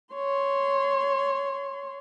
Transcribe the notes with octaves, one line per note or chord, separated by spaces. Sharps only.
C#5 C6